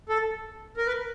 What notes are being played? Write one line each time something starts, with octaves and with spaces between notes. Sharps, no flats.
A4
A#4
B4